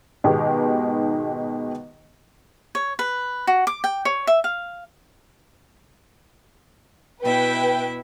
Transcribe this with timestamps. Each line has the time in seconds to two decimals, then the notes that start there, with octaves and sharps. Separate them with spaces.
0.24 G#2 B2 D#3 G#3 B3 G4
2.75 C#5
2.99 B4
3.47 F#4
3.67 D6
3.84 G5
4.05 C#5
4.27 E5
4.44 F5
7.22 B2 E4 B4 E5 G5